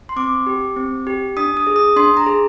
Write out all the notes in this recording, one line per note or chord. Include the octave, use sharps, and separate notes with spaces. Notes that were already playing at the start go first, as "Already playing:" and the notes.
C6
C4 D6
G4
C4
G4
D4 D#6
D#6
G#4
D#6
D4 C6
A#5
G#4